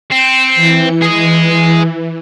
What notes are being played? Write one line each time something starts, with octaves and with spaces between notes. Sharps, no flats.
C4 G6 C#7
E3
G#4 D#5